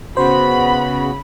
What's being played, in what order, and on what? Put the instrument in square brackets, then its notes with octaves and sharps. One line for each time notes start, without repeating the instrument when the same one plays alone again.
[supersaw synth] C#3 [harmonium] B3 F#4 [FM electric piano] C5 [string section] B5